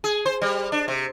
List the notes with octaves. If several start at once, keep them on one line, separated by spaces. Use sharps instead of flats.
G#4
C5
G3
D4
C3